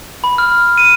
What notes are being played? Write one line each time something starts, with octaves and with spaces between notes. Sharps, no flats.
B5
F6
D#7